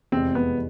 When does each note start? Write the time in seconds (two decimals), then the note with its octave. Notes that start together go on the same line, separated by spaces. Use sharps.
0.12 F1 E2 C3 E3 G#3 C4
0.35 B3